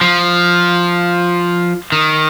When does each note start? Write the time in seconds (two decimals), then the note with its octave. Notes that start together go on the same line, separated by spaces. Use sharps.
0.01 F3
1.92 D#3